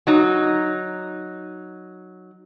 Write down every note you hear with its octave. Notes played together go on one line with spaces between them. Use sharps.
F#3 D#4